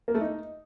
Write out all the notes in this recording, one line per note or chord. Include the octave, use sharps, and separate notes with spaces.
A#3
A3
D#4